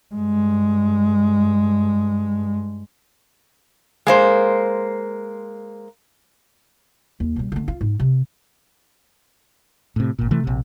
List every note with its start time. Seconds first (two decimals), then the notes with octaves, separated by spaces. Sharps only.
0.15 G2 G#3
4.07 G#3 A#3 C5
7.20 D#2
7.36 B2 G3
7.52 D3 A3
7.68 F4
7.81 G#2
8.00 C3
9.96 A2 C3
10.19 G#1 A#2
10.31 C3 E3 A3
10.44 A#1 C3